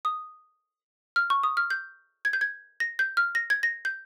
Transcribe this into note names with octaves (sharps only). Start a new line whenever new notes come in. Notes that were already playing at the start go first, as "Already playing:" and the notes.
D#6
F6
C#6
D#6
F6
G6
G#6
G6
G#6
A#6
G6
F6
A#6
G#6
A#6
G6